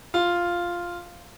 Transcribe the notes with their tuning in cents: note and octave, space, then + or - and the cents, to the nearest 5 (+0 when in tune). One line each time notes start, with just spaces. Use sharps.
F4 +0